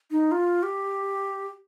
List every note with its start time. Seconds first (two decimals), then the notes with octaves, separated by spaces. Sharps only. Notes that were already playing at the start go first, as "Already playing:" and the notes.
0.11 D#4
0.31 F4
0.63 G4